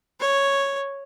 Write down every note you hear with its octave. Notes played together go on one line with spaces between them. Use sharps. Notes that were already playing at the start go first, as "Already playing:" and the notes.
C#5